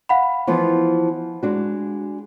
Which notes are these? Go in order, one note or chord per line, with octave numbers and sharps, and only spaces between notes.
F5 F#5 B5
E3 F3 B3
G#3 D4 F#4